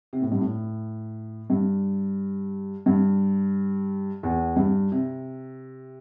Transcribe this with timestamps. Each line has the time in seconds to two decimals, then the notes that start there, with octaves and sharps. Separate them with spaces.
0.13 C3
0.22 A2
0.32 G2
0.41 A2
1.50 G2
2.86 G2
4.23 E2
4.56 G2
4.92 C3